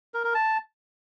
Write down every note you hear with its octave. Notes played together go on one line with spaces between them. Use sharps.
A#4
A#4
A5